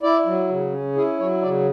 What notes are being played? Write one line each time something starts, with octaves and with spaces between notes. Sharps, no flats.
E4 D5
F#3
C#3
C#4
E4 G#4
F#3 C#5
C#3 D5